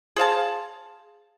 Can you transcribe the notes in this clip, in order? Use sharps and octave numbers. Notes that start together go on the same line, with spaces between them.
G#4 C5 F5 A5